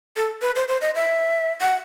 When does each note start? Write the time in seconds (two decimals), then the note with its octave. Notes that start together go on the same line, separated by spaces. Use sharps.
0.16 A4
0.42 B4
0.56 C5
0.68 C5
0.81 D#5
0.95 E5
1.61 F#5